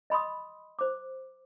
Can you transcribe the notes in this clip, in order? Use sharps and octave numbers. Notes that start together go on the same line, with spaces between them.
D#5 B5 C6 D#6
C5 D6